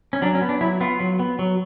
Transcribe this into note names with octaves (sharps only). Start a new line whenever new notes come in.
C#4
F#3 D4
C#4
B3
D4
F#3 E4
B3 F4
F#3
B3
F#3